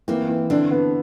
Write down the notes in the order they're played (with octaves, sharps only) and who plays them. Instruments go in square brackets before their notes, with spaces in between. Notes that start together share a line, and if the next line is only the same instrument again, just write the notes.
[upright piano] E3 [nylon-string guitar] A#3 C4
[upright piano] E3
[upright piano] D3 [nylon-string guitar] C4 D4
[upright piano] B3